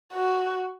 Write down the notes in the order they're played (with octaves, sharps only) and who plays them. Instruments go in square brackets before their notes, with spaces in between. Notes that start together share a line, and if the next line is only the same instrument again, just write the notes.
[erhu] F#4